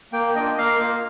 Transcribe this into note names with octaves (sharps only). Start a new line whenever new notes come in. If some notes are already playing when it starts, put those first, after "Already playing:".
A#3 G5
D4 F4 D#5
A#3 F5
F4